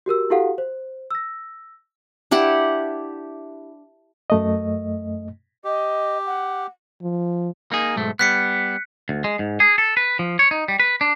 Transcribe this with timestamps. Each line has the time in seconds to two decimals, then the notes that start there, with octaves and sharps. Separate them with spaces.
0.06 F#4 G4 A#4 E6
0.30 E4 F#4 G4 A4 F5 F#5
0.58 C5
1.11 E6 A#6
2.31 D4 E4 G4 F#5
4.30 F#2 A3 D#5
5.65 G4 D#5
6.26 F#5
7.02 F3
7.72 A#3 D#4 G#4
7.96 B1 G#2 A3
8.19 G3 B3 F#6 B6 C#7
9.09 D2
9.24 G#3
9.39 G#2
9.60 G#4
9.78 A4
9.97 B4
10.19 F3
10.39 C#5
10.51 D#4
10.68 G3
10.80 B4
11.01 D4